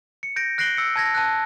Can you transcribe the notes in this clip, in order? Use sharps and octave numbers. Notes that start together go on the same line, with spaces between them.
C#7
G6 A#6 D7
F#6 A#6 C7 D7 F#7 G7
E6 C#7
A5 G#6 A#6
A5 F#6